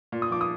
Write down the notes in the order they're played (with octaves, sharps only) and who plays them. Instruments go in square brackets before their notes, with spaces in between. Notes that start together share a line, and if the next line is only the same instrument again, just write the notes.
[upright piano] A#2
D#6
F3 D6
D#6